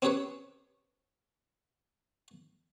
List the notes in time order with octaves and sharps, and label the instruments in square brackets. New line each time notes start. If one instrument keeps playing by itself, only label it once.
[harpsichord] C4 C#4 G4 G#4 B4 C#5